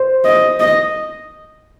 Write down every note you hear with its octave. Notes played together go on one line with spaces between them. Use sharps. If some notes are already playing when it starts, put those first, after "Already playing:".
Already playing: C5
D#5
D#5